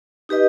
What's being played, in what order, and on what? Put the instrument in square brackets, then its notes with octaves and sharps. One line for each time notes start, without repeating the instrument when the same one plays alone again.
[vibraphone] D#4 G4 B4 D#5